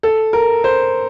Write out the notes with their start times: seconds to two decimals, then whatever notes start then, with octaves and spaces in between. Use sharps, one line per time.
0.03 A4
0.33 A#4
0.64 C5